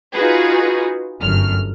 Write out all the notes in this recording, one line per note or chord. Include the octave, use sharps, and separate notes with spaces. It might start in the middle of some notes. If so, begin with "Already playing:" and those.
D#4 F4 F#4 G#4 B4
G1 F#2 F6